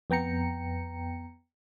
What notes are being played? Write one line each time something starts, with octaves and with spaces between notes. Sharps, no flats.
F2 B3 G5 A#5 C#7